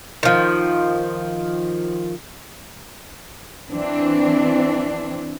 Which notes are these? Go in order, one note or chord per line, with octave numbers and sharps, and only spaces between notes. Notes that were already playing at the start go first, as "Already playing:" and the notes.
D#3 F3
E3 C4 D4